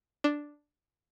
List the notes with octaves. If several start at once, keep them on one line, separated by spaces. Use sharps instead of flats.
D4